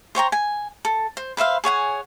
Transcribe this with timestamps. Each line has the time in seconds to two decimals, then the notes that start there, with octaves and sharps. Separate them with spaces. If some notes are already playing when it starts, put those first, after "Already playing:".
0.15 C5 C#5 G5 A#5
0.32 G#5
0.85 A4
1.17 C5
1.37 B4 C5 E5 F5
1.64 G#4 C#5 F#5 G#5